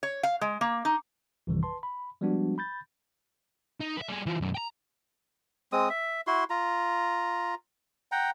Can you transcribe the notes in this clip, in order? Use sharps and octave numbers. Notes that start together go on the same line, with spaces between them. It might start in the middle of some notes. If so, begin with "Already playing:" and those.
C#5
F5
G#3
A#3
D#4
A1 F2 C3 D#3 E3 G3
B4 A5 C6
B5
F3 G3 G#3 B3 D4 F#4
B5 G6 A6
D#4
B4 E5
G3 G#4
E3 F4
B1 F#2
G5 A#5
G#3 C4 D#6
E5
E4 F#4 C6
F4 A#5
F#5 G5 A#5